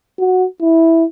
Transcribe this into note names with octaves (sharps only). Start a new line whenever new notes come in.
F#4
E4